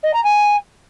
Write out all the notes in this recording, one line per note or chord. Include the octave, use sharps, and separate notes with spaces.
D#5
A#5
G#5